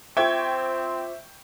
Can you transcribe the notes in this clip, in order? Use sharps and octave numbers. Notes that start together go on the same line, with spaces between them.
C4 F4 C5 E5 G5 C#6 D6 G#6